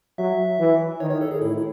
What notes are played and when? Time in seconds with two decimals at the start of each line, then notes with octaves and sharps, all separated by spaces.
0.18 F#3 E5
0.60 E3
1.00 D#3 C#5
1.11 C#5
1.21 A4
1.31 G#4
1.42 A2 E4
1.57 E4